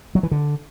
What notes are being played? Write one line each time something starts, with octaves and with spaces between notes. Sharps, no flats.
F#3
E3
D3